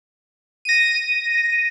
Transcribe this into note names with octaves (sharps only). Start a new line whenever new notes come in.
A#6 D#7